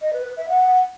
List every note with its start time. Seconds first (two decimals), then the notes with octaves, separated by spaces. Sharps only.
0.01 D#5
0.13 B4
0.25 B4
0.37 E5
0.49 F#5